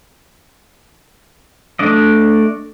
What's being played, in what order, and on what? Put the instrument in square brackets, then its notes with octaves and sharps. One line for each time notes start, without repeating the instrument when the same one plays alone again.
[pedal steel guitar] A3 D4 D5 D#5